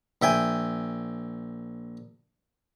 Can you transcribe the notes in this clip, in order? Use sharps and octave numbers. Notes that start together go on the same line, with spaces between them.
A#1 E5 G5 G#5